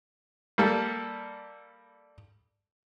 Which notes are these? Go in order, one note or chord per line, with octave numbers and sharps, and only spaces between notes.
G3 A#3 A4